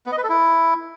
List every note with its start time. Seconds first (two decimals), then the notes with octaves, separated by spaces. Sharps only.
0.06 B3
0.12 D#5
0.18 B4
0.23 A4
0.29 E4